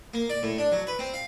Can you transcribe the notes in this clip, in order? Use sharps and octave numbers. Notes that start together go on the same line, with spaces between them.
A#3
D5
A2
D4
F#3
B4
C4
F5